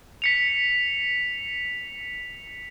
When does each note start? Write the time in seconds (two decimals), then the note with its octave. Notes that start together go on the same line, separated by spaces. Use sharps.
0.22 B6 C#7 F7